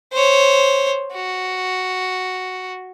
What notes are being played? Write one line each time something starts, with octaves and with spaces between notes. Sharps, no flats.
C5 C#5
F#4